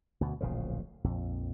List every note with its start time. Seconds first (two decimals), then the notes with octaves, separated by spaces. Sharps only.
0.21 D2 B2
0.41 D1 A#1 C#3 F3
1.04 A#1 F2